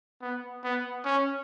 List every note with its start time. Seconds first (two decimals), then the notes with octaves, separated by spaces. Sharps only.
0.22 B3
0.64 B3
1.05 C#4